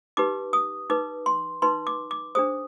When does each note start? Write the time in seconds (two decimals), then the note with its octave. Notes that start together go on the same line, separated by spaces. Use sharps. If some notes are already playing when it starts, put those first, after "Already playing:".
0.17 D#4 G4 B4 D6
0.53 D#6
0.90 D#4 B4 D6
1.26 C6
1.62 D#4 B4 C6
1.87 D6
2.11 D6
2.35 D4 G#4 C5 D#6